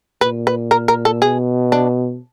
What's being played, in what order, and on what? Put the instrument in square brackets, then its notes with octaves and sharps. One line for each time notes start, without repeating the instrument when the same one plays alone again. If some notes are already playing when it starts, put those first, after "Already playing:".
[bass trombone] A#2 [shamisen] B4
[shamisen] B4
A#4
A#4
A4
[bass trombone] B2 [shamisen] G#4
[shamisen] D4